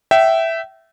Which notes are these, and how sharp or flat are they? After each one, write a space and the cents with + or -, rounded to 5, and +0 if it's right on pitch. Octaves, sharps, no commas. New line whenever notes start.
E5 +0 G5 -30